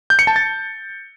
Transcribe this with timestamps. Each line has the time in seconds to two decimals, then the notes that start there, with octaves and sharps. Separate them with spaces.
0.10 G6
0.19 C#7
0.27 A5
0.36 A6